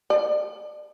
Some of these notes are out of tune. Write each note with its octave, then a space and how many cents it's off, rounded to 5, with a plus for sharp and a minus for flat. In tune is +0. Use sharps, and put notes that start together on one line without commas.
D5 +40